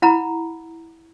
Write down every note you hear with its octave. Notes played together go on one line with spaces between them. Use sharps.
E4 F#5 A#5 B5